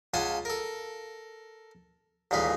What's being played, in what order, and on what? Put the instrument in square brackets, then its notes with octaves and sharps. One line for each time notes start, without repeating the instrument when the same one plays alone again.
[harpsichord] C#2 F4 F#5 G#5 A5
A4 A#4
A1 D#2 A#2 G#3 F5 B5